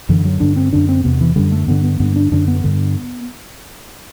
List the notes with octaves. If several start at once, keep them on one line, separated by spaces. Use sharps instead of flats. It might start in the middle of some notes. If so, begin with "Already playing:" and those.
F#2 D3 E3
F#3
G2 D3 D4
C4
F#2 D3 D4
C4
E2 C3 B3
E3
F#2 D3 G3
A3
G2 D3 B3
B3
G2 D3 B3
D4
F#2 D3 D4
B3
G2 D3